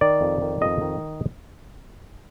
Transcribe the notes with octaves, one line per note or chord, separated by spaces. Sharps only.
D#3 D5
F2
D#3
F2 D#5
D#3